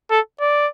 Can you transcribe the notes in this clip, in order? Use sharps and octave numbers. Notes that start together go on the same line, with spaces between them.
A4
D5